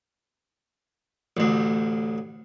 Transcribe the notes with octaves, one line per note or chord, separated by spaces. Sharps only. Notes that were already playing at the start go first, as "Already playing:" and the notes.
A1 D2